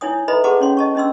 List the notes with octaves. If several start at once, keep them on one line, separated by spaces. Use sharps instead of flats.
D#4 E4 C#5 G#5 D#6
A4 B4 D#5 E5 A#5 B5
G#4 B4 F#5 A5 C6 D6
C#4 C#5 C6
D#5 A5 C#6
C#4 D4 D#5 C6 E6